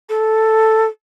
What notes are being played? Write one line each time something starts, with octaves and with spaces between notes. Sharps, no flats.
A4